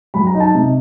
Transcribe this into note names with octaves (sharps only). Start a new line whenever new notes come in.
F#3 B5
A#5
D#4
A5
C3